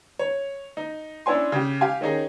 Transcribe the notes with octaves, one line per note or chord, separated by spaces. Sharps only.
C#5
D#4
C#4 D4 E4 C#5 G#5 C6
C#3 G4
G4 F5 G#5
D#3 C#4 D#4 G#4